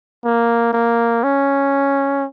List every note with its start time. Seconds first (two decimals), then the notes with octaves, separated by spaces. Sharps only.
0.24 A#3
0.73 A#3
1.23 C#4